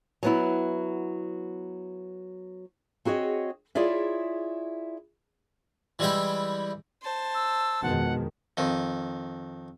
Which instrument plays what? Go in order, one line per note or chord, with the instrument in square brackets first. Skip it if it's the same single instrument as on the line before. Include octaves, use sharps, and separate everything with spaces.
[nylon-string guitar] F#3 B3 E4
[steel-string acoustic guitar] C4 F#4 G#4 C#5 D#5
E4 F4 G#4 C#5 D5 E5
[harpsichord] E3 G3 G#3 E4 E5 G5
[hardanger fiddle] C5 A5
[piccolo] E6
[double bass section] F2 D#3 G#3 [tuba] B2 [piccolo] F#5
[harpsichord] F2 D#3